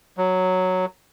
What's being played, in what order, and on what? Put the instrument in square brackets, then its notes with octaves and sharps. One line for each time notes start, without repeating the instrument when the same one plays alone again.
[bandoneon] F#3